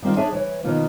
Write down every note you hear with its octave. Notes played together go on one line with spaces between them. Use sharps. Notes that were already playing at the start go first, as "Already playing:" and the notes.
D#3 G3 C4 F4
D4 G#4 C#5 E5 G#5
E3 B4 C#5
B2 D#3 F3 A#3 B3 F4